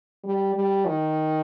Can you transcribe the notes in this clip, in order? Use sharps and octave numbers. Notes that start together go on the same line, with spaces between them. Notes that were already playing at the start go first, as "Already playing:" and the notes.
G3
G3
D#3